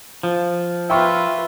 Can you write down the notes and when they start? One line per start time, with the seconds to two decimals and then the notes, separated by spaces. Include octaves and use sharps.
0.23 F3
0.90 F4 B4 E5 G5 C#6 F6